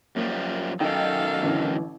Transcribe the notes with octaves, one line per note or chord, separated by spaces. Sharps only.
F#2 F3 G3 A#3
F#2 D#3 D#4 A4 D#5 F5 G5
A1 D3 E3